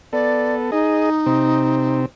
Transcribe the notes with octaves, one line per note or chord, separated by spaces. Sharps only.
B3 A4 D5
D#4 G#4 D#5
C3 C4